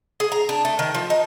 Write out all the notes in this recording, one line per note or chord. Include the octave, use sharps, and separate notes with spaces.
G#4
A#5
D4
A3
D#3
F3
D#4